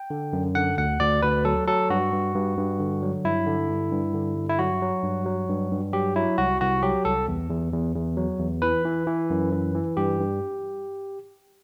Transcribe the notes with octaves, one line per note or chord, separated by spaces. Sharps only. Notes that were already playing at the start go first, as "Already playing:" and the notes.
Already playing: G5
D3
F#2
D3 F#5
D2 F#5
D2 D5
D2 B4
F#3 A4
F#3 A4
G2 F#4
G2
G2
G2
D3
F#3
G2 E4
D3
G2
G2
D3
G2
E4
F#3 F#4
F#3
G2
F#3
G2
G2
F#3 G4
F#3 E4
C2 F#4
C2 F#4
F#3 G4
C2 A4
E2
E2
E2
E2
F#3
E2
E3 B4
E3
E3
F#2
E3
E3
G2 G4
G2